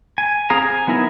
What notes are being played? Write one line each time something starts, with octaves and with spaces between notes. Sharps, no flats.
G#5
C4 G#4 F5 A#5
G#5
F#3 B3 D#4 E4 A#4